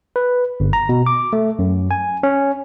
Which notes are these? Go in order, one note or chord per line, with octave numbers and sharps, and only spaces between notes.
B4
G1
A#5
B2
D6
A3
F#2
G#5
C#4